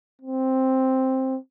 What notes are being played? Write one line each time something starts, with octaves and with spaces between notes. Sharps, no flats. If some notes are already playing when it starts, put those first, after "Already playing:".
C4